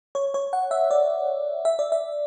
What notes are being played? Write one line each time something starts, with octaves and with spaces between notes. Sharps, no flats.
C#5
C#5
F#5
E5
D5
E5
D5
E5